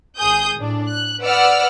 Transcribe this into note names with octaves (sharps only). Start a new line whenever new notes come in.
G#1 G#4 D#6 G6
A2 D4
F#6
B4 D5 F#5 E6 F6